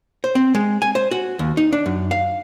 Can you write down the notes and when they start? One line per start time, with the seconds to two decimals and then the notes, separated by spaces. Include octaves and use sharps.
0.24 C5
0.35 C4
0.55 G#3
0.82 G#5
0.95 C5
1.11 F#4
1.39 D#2
1.57 D#4
1.73 D4
1.86 F#2
2.11 F5